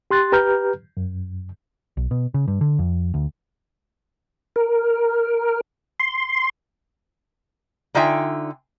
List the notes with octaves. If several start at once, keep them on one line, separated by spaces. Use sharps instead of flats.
G4 C6 F#6 A6
G4 B4 A#5 F6 G6
F#2
B1
B2
C#3
G2
D3
F2
D2
A#4
C6
D3 D#4 F4 E5 G5 G#5